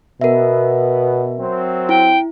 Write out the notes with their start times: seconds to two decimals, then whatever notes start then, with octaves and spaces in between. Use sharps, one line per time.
0.21 B2 B3 A#4 E5
1.38 F#3 C4
1.89 E4 G5